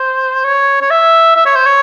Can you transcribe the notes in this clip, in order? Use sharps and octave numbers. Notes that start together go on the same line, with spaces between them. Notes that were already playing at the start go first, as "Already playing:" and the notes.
Already playing: C5
C#5
C#5
E5
E5
C#5
C5
C#5